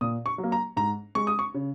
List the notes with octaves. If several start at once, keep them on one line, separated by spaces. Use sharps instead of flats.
A#2 D#6
C#6
F#3
A#3
A#5
G#2 A#5
G#3 C#6
D#6
C#6
C#3